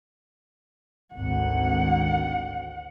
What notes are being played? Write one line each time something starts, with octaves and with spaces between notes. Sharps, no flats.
G#1 D2 F#5